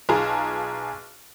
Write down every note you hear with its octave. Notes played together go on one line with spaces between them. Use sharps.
B1 F4 G#4 A5 A#5